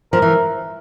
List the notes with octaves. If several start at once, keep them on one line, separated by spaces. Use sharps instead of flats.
F3 A#4
E3